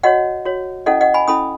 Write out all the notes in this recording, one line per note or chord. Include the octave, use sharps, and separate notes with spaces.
F#4 C#5 D#5 F#5
F#4 C#5
C#4 E4 A4 D#5 F#5
D#5 F#5
G#5 B5
C#4 E4 A4 B5 D#6